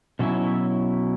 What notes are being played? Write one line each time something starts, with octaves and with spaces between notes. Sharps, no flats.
B2 F#3 C#4 E4